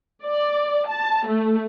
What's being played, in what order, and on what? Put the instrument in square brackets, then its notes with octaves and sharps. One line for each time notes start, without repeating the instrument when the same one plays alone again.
[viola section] D5
A5
A3